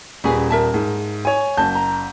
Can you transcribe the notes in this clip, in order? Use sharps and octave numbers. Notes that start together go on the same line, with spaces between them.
D#1 C#4 G#4 B4
A#4 E5 A5
G#2
C#5 G#5
F#1 A5 G6
A#5